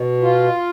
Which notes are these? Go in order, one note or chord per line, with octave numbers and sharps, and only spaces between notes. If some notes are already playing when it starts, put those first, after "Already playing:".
Already playing: B2
F4